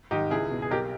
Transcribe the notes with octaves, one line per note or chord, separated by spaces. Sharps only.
G#2 D#3 D#4 G4
C#2 E4 G#4
B2
G#4
B1 G4 A#4